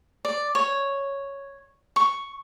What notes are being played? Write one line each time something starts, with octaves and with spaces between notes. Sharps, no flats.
D5
C#5
C#6